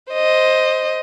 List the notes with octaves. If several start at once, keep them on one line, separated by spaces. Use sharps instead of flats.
C5 D#5